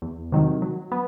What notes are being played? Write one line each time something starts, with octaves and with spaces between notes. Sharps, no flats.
E2
C3 D#3 F#3
F#3
B3